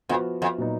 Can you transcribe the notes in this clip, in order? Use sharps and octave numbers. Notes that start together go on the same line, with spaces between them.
F2 F3 B3 F#4
F2
A#2 F#3 B3 D#4